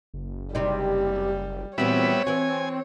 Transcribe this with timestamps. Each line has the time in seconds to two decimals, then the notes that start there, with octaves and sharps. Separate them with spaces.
0.14 F#1
0.55 C3 G3 D#4
1.78 A#2 E3 F#3 G3 B3 C4 C#5 E5
2.27 E3 F#4 G#5